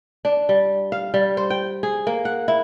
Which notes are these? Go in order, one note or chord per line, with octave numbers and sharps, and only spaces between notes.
D4
G3
F5
G3
C5
G5
G#4
A#3
F#5
E4